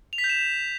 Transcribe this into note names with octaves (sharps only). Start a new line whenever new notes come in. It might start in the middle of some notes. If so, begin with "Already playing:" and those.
F7
B6
G6
E7